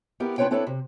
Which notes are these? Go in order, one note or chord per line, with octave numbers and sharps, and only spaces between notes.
B3 E4 G4 A#4
D4 F4 B4 C#5 G5
C4 D4 E4 A4 B4 C#5
C3